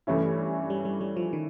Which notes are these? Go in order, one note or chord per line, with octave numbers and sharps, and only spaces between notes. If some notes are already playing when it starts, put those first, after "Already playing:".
G2 E3 A3 C#4 E4
G3
G3
G3
F3
D#3